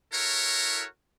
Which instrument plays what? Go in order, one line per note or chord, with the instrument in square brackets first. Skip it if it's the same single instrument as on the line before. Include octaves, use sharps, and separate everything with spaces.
[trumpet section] E4 F#4 A4 A#4 C#5